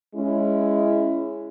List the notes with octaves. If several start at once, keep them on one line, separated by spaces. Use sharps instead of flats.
G#3 C#4 E4